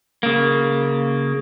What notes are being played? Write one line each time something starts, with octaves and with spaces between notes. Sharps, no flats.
C#3 A#3